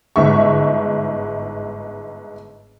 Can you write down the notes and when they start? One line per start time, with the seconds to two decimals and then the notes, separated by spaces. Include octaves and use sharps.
0.16 G1 G#2 E5 C#6